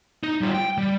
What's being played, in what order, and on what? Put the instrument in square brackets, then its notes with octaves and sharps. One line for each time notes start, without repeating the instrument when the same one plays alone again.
[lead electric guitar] D#4
G3 F4
G5
G3